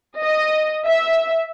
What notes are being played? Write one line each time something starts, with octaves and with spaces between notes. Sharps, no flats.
D#5
E5